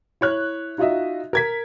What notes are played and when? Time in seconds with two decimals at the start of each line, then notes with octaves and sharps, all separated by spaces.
0.21 E4 C#5 F#6
0.78 D#4 F4 F#4 D#5 E5
1.33 A#4 G#6 B6